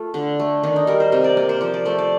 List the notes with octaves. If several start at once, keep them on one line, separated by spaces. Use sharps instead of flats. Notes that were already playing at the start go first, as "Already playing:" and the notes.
Already playing: A3 F4
D3 D4
A3
D#3 D4
D#4
G3 A#4
C5
C3 C5
D5
A#3 D5
C5
F3 C5
D5
A3 C5
D5